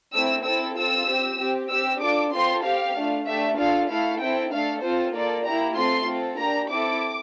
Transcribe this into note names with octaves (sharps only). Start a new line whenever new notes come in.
A3 C4 E4 E6
C4 E4 A4 E6
C4 F4 A4 E6
C4 G4
C4 G4
C4 G4 E6
D4 F4 A4 D6
C4 F4 A4 C6
C4 G4 F5
A3 D4 F4
A3 D4 G4 E5
D4 F4 A4 F5
A3 E4 A4 F5
C4 E4 A4 G5
A3 D4 A4 F5
C4 F4 A4 C5
A#3 F4 A4 D5
A#3 E4 G4 A#5
A3 C4 F4 A4 C6
C4 F4 A4
A#3 D4 G4 A#5
C4 E4 A4 D6